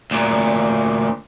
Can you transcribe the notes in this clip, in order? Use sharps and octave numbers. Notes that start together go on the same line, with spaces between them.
D2 A#2